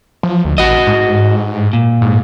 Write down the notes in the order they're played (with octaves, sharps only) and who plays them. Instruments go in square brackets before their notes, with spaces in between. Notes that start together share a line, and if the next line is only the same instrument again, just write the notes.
[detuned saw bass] F3
D2
[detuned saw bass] A1 [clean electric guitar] F#4 D#5
[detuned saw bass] G#2
[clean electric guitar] A#2
[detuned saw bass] G#2